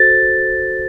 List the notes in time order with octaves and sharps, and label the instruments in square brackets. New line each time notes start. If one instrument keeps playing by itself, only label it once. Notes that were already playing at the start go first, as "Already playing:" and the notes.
Already playing: [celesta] F#4 A4 C5 A6